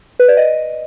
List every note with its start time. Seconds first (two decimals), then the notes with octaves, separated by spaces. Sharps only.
0.20 B4
0.28 D5
0.37 D#5